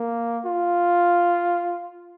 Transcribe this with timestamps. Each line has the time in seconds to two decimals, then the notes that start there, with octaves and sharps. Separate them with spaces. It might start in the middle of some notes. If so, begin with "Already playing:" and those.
Already playing: A#3
0.46 F4